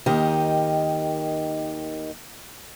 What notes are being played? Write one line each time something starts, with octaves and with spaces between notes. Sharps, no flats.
D#2 D#3 G4 D#5